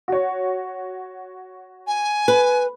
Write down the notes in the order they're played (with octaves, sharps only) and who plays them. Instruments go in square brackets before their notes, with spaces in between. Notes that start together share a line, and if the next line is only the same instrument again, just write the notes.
[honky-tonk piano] F#4 C#5
[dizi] G#5
[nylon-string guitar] B4